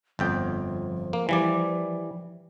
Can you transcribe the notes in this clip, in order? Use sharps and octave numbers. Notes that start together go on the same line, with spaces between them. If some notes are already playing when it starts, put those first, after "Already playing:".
G1 F2 F3 G5
A#3
E3 G3 D5